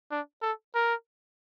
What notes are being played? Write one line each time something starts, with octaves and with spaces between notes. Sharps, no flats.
D4
A4
A#4